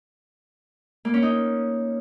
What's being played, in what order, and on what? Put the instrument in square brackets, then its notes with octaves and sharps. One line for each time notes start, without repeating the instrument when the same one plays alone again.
[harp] A#3
C#4
D#4